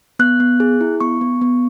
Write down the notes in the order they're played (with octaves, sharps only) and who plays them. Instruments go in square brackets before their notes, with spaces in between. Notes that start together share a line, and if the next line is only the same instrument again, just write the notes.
[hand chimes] B3 F#6
B3
G#4
E4
B3 C#6
B3
B3